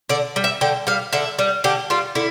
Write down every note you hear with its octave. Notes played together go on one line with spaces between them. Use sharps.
D3 D5
G3
E5
D3 G5
G3 F5
D3 E5
G3
D3 G4
G3 F4
D3 E4